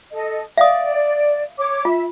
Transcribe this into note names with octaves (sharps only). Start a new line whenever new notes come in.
A4 D#5
D5 E5 F5 D#6
C#5 D6
F4 E5